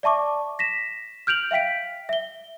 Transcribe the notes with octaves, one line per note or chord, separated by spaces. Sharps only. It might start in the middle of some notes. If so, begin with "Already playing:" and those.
D5 E5 A5 C#6 D6
A#6 B6 E7
F6 G6 D7 F7 F#7
E5 F5 G5 B6 D7
E5 G7